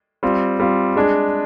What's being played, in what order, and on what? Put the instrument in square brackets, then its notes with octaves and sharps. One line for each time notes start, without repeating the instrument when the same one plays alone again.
[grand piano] G3 C4 F4
G3 C4 F4
G#3 D4 G#4